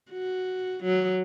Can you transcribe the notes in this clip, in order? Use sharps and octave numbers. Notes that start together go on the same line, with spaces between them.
F#4
F#3